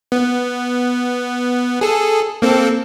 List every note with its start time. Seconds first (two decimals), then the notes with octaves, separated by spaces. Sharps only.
0.12 B3
1.81 G#4 A4
2.42 A#3 C4 A4